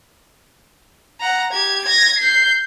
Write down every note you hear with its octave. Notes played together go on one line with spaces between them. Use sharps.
F#5 A#5
G4 G#6
G#6 A#6
G6 C7